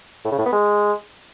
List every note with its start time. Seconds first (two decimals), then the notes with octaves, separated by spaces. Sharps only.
0.25 A2
0.32 C#3
0.39 A2
0.46 B3
0.53 G#3